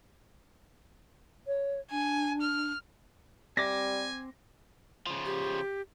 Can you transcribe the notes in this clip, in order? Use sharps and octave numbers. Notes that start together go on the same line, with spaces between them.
C#5
D4 G#5
F6
G3 C4 G#5 D6 A#6
C#3 F3
G4